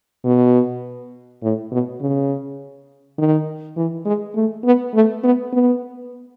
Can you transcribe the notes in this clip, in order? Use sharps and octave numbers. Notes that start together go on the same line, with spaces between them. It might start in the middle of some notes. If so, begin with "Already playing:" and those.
B2
A2
B2
C#3
D#3
E3
G#3
A3
B3
A3
B3
B3